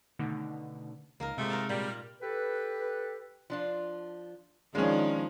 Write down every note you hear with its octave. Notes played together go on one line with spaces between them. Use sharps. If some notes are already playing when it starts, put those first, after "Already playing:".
B2 D3 D#3 A3 C#4 D#4
C#2 A#3 D#4 A#4
G#2 C3 F3 G#3 A3
A#4 F5 A5
A#2 G3
G4 A4 B4
F3 D4 F4
D#3 F3 G#3 A#3 C#4 D4